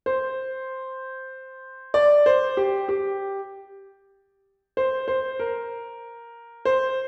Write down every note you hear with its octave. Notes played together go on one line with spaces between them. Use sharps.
C5
D5
C5
G4
G4
C5
C5
A#4
C5